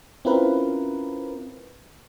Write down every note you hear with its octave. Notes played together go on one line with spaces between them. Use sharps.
C4 C#4 E4 F4 A#4 B4